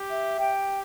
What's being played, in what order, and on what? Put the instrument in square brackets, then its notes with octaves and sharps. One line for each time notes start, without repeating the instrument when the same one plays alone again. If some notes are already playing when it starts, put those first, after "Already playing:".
Already playing: [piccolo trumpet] G4
[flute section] E5
[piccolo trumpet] G4 [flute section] G5